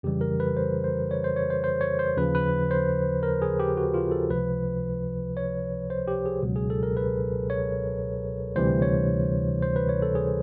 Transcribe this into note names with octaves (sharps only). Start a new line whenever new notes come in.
F2 C#3 E3 G3 G4
A#4
B4
C5
C5
C#5
C5
C#5
C5
C5
C#5
C5
D#2 C#3 F3 B4
B4
C5
A#4
G#4
G4
F#4
F4
A4
C#2 C3 F3 B4
C#5
C5
G4
G#4
C#2 B2 F#3
G#4
A4
A#4
B4
C#5
D2 C3 E3 G3 C5
C#5
C5
B4
C#5
A4
G#4